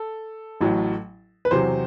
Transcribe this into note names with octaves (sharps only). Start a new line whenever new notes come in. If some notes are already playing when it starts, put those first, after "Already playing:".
Already playing: A4
A1 A2 F#3
B4
E2 C3 F#3 C5